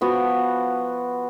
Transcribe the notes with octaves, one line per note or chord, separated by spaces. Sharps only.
F3 B3 F#4